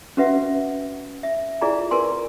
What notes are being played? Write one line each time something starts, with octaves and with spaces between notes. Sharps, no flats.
C#4 F#4 B4 E5 F#5
E5
E4 F4 G#4 D5 G#5 A#5
A#4 B4 G#5 C6